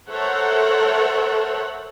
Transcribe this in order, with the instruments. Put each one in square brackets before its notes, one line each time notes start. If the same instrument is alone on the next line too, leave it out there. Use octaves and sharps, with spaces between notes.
[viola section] A4 A#4 C5 C#5 E5 F#5